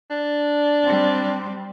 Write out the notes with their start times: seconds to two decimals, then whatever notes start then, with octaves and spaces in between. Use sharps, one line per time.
0.10 D4
0.84 G3 C4